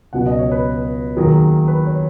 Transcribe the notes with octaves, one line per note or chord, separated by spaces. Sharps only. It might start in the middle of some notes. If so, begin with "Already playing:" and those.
C#2 B2 F#3 F#5
D#5
C#5
B4
D#2 D#3 F#3 G#4
B4
C#5